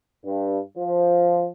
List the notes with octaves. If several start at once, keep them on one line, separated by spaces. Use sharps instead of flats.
G2
F3